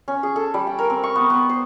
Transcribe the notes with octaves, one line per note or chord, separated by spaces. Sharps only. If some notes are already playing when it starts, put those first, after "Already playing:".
C#4
G#4
A4
G3
G5
A#4
C4
C#6
B3
B3
C5